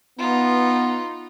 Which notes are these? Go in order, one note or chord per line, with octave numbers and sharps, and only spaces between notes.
B3 D#4 F4